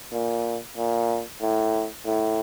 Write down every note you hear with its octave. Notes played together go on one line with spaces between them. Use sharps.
A#2
A#2
A2
A2